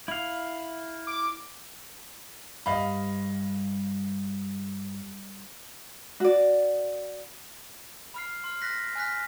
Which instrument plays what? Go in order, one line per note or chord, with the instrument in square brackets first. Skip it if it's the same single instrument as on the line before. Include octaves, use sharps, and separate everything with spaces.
[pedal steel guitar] E4 F5
[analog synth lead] D6
[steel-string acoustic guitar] G2 [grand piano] D#5 F5 B5
[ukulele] F#4 D5
[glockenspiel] B5 F6 C7
C6 F6
F#6 A#6 B6
G#5 F6 F#6 B6